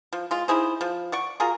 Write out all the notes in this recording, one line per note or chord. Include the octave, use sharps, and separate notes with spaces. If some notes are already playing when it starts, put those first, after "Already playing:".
F3
G#3 F4
D#4 E4 G#4 C5
F3
D5 F#5 C#6
F4 F#4 G#4 A#4